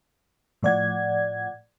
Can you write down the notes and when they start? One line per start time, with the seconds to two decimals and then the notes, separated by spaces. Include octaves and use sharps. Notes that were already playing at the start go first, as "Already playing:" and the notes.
0.63 A2 F3 D5 F#5 G#6